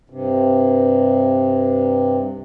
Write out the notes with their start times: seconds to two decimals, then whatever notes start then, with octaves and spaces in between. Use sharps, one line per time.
0.10 G2 C3